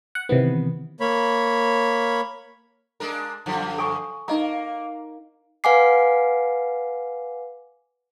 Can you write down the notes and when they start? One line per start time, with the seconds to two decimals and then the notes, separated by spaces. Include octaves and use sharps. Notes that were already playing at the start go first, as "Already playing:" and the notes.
0.15 F#5
0.29 C3 D#3 E3 B3
1.00 A#3 C#5 B5
3.00 G#3 D4 A#4
3.46 F#2 D3 F3
3.78 A4 G#5 C#6
4.28 A#3 D#4 D#5 A#5
5.64 B4 F5 F#5 G#5 D6 C7